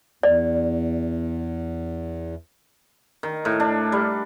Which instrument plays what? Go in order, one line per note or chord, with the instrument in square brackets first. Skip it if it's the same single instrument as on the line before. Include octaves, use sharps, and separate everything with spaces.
[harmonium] E2 [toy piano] D5
[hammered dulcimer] D#3
A2
D4
G3